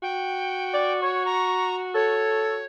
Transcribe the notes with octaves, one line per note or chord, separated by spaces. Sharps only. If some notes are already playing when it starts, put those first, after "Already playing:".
F#4 G5
D5
C#5 C#6
A#5
A4 C#5